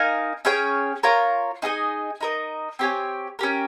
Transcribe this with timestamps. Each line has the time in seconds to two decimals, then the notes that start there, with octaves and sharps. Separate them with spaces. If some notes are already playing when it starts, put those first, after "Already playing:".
Already playing: D#4 A#4 F5 G#5
0.45 C#4 G#4 C#5 G5
1.03 F4 A#4 C#5
1.62 D#4 G#4 D#5 G#5
2.20 D#4 A#4 D#5
2.79 C4 G4 C#5 G#5
3.39 C#4 G4 A#4